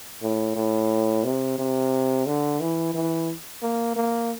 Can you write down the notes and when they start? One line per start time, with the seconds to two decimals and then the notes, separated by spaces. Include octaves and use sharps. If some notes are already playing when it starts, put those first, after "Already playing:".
0.22 A2
0.56 A2
1.24 C3
1.59 C3
2.27 D3
2.60 E3
2.95 E3
3.63 A#3
3.96 A#3